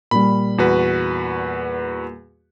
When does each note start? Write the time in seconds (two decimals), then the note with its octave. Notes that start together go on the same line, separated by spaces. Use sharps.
0.11 A#2 G3 B5
0.58 E2 F#4 B4